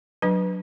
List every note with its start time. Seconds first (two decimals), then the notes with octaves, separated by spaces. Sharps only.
0.22 F#3 D4 B4